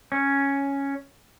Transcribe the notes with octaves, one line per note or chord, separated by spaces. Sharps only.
C#4